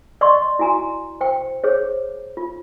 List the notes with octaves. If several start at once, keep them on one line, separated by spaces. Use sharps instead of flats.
D5 D#5 C6 C#6
E4 F#4 G#5 A#5 C6
C5 G5
G#4 C5 C#5
F4